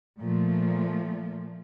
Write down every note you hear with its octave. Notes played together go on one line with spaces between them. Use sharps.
A#2 F3 A3